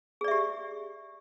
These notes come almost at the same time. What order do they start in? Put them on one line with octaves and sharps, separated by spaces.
G#4 D5 E5 G4